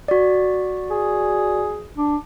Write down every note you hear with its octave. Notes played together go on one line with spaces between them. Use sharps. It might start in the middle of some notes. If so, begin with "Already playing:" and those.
F#4 D5
G#4
D4